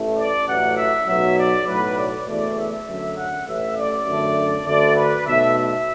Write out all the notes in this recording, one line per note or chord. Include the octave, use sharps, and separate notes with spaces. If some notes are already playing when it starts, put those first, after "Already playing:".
Already playing: A1 A2 A3
D5
A1 A2 F#3 A3 F#5
E5
B1 B2 F#3 E5
D5
B1 A2 F#3 B4
D5
F#1 E2 E3 A3 D5
E5
F#2 D3 F#3 A3
F#5
A1 A2 A3 E5
D5
F#2 D3 A3
D2 D3 A3 D5
B4
B1 B2 A3 E5
E5